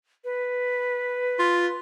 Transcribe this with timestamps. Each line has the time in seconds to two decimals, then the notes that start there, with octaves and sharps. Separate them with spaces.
0.24 B4
1.39 F4